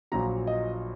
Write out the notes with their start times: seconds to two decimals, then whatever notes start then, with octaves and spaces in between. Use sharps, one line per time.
0.12 A#1 A#2 F#3 A#5
0.47 D#5